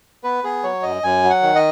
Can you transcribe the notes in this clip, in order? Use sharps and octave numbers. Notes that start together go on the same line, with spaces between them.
B3 B4
B3 G#4
F#3 C#5
F#2 D#5
F#2 G#5
F#3
F#5
D#3
D#5